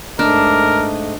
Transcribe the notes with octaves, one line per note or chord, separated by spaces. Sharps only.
G#2 A3 D4 A#4 D#5